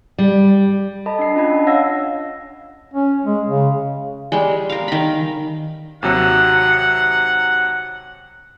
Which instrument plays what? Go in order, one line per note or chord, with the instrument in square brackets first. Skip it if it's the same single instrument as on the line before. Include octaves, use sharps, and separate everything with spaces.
[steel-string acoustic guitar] G3
[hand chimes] A4 D#5 A5 B5
D4 C7
C#4 F4 D#5 B5 G#6
D4 A5
C#5 F5 F#5 E6 G#6 A#6
[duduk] C#4
G#3
C#3
[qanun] G3 G#3
A#4 F5
D#3 B5
[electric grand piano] D#2 C3 F#3 [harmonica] F#5